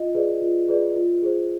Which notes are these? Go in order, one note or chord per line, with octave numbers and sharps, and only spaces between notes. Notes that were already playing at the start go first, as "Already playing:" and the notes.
Already playing: F4 D#5
G#4 B4 D5
F4
G#4 B4 D5
F4
G#4 C5